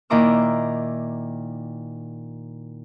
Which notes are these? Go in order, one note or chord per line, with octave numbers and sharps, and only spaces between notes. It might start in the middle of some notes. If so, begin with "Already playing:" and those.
A#2 D#3 E4 A#5 D6 E6